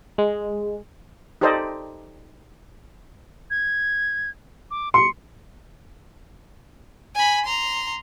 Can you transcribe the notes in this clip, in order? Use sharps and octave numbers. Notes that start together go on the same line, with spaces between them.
G#3
D#4 G4 A4 C5 D5 D#5
G#6
D6
C6 C#7
G#5 B5
A#5 C6